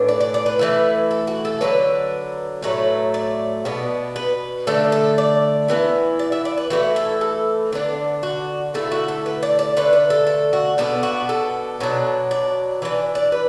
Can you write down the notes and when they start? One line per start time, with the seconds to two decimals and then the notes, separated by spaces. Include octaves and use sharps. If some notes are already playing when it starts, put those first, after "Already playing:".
Already playing: A2 E3 B3 D4
0.08 D5
0.21 D5
0.34 D5
0.46 B4
0.59 E3 A3 E4
1.11 A4
1.27 F#4
1.45 A4
1.61 D3 F#3 D4 B4
2.62 A2 F#3 A3 B4
3.14 D5
3.65 B2 B3 D4
4.16 B4
4.67 D3 A3 D4 A4
4.92 A4
5.18 D5
5.68 E3 B3 E4
6.19 D5
6.32 E5
6.45 D5
6.58 B4
6.70 E3 A3 E4 F#4
6.96 A4
7.21 A4
7.73 D3 B3 D4
8.23 F#4
8.74 D3 A3 E4 A4
8.92 F#4
9.08 A4
9.26 B4
9.43 D5
9.59 D5
9.77 D3 A3 D4 B4
9.93 B4
10.10 A4
10.27 A4
10.53 F#4
10.78 B2 B3 D4 A4
11.03 F#4
11.29 A4
11.80 B2 F#3 D4
12.31 D5
12.82 E3 D4 B4
13.15 D5
13.32 B4